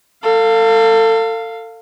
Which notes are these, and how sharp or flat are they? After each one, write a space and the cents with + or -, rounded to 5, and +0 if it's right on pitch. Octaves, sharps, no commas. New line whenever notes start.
A4 +35 F5 +0